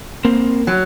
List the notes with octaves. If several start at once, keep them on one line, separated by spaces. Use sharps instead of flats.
A#3 C4 A#4 C5
F#3